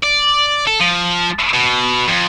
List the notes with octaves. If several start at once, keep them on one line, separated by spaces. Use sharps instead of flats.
D5
A4
F3
B2
F2